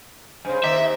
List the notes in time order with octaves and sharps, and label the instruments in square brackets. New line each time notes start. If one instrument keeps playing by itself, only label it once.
[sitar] G2 C#3 [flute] C5 [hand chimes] G#5
[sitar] D#2 C4 [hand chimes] D#5 A#5 D6 [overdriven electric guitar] E5